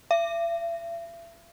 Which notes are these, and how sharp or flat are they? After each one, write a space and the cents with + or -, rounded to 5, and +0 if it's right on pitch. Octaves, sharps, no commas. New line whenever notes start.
E5 +40